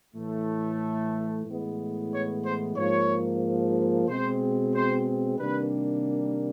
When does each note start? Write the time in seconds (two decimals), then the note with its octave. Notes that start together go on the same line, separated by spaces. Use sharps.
0.14 A2 E3 A3
1.46 A2 E3 G#3 B3
2.11 C#5
2.45 C5
2.77 G#2 F3 A#3 C#5
4.08 B2 G#3 C4 C5
4.74 C5
5.39 C3 D#3 G3 A#3 D4 B4